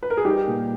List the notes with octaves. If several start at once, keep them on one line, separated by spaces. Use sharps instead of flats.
B4
A#4
G#4
G3 D#4 G4
A#2